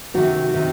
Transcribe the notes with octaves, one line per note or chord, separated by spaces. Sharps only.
C3 D#3 F#4
C3 D#3